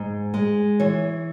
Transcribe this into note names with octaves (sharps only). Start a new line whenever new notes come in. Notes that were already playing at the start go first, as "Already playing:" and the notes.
Already playing: G#2
G#3
E3 C#5